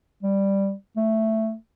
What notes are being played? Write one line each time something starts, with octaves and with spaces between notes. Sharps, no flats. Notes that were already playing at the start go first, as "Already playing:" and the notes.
G3
A3